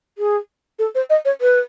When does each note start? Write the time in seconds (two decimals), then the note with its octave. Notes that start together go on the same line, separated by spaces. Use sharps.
0.18 G#4
0.79 A4
0.95 C5
1.10 D#5
1.25 C#5
1.41 B4